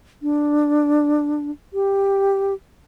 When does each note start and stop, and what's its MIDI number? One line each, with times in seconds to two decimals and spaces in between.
0.22 1.51 62
1.74 2.54 67